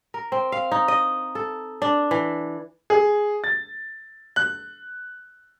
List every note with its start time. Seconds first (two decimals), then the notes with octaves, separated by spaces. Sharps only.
0.14 A#4
0.32 C4
0.52 F5
0.72 D#4
0.88 D#5
1.35 A4
1.82 D4
2.11 E3
2.90 G#4
3.44 A6
4.36 F#6